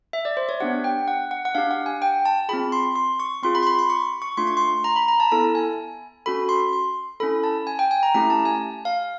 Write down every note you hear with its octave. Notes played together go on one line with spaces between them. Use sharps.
E5
D5
C5
C#5
B3 D4 G4 F#5
G5
F#5
F#5
F#5
D4 G4 F5
F#5
G#5
G5
A5
C4 F4 G#4 B5
C6
C6
C#6
C4 F4 G#4 C6
B5
C6
B5
C6
C#6
C#6
A3 D4 F4 C6
C#6
C6
A#5
B5
A#5
A5
B3 E4 A4 A5
G#5
C#4 F#4 A4 B5
C6
C6
C#4 E4 A4 B5
A5
G#5
G5
G#5
A#5
A3 C#4 E4 G4 A#5
A5
G#5
F5